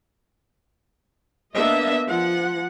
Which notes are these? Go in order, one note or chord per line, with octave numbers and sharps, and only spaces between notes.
A#3 B3 D4 D#5 E5
F3 F#5